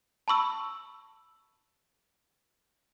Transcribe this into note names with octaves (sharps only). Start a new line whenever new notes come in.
A5 B5 C#6 E6